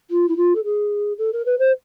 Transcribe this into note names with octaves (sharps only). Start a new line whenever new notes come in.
F4
E4
F4
A4
G#4
A4
A#4
B4
C5